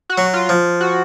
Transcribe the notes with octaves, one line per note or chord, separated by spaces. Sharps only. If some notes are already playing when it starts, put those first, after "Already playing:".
F#4
F#3
F4
F3
F#4